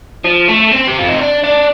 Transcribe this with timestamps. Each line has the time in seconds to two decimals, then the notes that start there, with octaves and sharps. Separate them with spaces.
0.25 F3
0.49 A3
0.72 C4
0.88 G4
0.99 F4
1.09 D#4
1.20 D4
1.44 D4